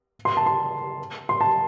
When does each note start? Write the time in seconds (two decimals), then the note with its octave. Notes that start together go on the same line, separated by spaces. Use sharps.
0.25 C6
0.37 A5
0.46 C6
1.29 C6
1.41 A5